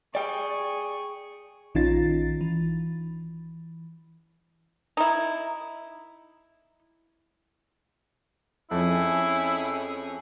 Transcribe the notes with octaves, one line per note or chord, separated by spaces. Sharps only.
G#4 D5 G5 C#6
A#1 D#3 C#4 D#4 F4 A6
E3
D#4 E4
F2 C#4 E4 G#4